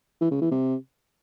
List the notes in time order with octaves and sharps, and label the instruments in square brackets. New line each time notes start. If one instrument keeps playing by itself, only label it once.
[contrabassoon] E3
C#3
E3
C3